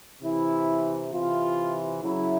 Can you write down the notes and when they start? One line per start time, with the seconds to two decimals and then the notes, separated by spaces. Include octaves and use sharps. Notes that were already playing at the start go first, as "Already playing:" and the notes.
0.22 C3 E3 E4
1.12 C3 E3 F4
2.02 C#3 F#3 E4